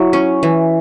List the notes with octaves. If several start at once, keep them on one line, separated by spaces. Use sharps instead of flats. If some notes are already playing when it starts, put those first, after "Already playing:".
Already playing: F#3 E4
C#4
E3